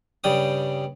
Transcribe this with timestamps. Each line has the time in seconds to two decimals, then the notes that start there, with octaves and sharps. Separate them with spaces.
0.24 G2 C#3 G3 G5 D#6